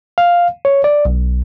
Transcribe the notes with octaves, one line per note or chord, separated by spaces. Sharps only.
F5
C#5
D5
B1